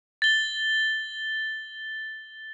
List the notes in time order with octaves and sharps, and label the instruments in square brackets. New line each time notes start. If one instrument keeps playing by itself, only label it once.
[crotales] A6 G7